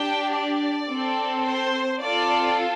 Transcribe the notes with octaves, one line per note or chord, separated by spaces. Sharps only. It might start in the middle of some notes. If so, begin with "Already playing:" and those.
Already playing: D4 G4 G5
D5
C4 A4
C5
C4 F4 A4 D5